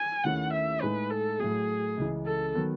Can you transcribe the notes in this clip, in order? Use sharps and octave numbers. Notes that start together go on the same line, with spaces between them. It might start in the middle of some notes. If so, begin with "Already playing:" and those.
Already playing: G#5
D#2 D#3 A3 C#4 E4 F#5
E5
A2 G#3 D#4 G#4 B4
A4
A2 F#3 A3 G#4
C#2 C#3 E3
A4
D#3 F#3 B3